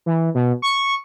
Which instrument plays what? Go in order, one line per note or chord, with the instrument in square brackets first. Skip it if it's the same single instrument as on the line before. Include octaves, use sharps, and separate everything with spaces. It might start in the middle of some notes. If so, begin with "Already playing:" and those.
[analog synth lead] E3
B2
C#6